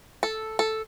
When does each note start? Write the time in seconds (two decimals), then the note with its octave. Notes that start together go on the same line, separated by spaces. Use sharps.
0.23 A4
0.59 A4